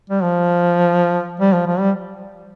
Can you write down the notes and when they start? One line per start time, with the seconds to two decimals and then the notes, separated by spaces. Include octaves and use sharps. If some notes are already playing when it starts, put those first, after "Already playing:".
0.10 G3
0.23 F3
1.40 G3
1.53 F3
1.66 F3
1.79 G3